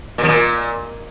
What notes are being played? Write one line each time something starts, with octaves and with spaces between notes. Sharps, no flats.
A#2
F3
A#2